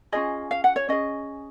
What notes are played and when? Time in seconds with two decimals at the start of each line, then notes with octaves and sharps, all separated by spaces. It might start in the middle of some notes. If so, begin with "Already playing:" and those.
0.12 C#4 F4 G#4 D#5
0.51 F5
0.64 F#5
0.76 C#5
0.89 C#4 G#4 D#5